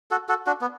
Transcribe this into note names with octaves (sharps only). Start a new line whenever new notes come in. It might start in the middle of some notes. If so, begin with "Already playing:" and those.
F#4 A4
F#4 A4
D4 F#4
B3